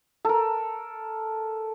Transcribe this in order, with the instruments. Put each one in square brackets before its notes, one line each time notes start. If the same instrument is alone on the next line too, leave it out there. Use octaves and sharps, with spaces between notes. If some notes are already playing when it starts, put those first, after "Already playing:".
[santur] A4 A#4